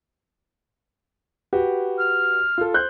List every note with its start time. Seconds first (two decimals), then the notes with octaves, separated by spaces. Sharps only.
1.53 F#4 G4 B4
1.98 F6
2.58 F4 A4
2.74 C5 F#6 G6